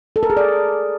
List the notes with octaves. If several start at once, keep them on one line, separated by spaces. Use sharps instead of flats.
A4
A#4
G#4
D5